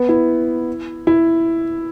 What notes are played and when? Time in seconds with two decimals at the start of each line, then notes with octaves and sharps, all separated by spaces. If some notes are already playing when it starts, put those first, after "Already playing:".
Already playing: B3
0.09 E4
1.07 E4